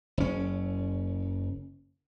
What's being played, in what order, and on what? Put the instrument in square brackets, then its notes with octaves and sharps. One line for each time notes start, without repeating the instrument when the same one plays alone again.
[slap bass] F#1 C#4